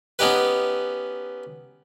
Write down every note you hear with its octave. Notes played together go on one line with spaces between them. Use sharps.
B3 C#4 D#4 G4 B4